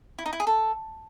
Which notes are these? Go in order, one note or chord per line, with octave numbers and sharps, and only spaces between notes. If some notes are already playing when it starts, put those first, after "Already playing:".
E4
D#4
E4
G#4
A4